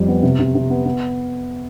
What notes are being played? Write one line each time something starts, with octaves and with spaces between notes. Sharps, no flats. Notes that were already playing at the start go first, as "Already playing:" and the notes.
Already playing: F2 G3
B3
C3
C3
C3
B3
B3